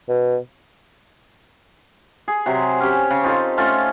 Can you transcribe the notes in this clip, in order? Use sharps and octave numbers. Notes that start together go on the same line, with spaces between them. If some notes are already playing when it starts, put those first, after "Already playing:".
B2
G#4
C3 F#3
C#4 G4 C#5
C#3
C4 D#4 F4 A4
A3 C#4 F4 A4